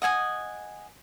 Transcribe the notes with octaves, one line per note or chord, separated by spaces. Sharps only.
D#5 F#5 G#5 D#6